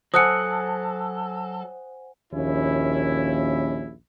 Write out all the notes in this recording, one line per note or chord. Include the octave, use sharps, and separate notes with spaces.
F#3 A4 C5 F#5 G#5 D#6 F#6 C#7
A#1 D#2 C#4 E4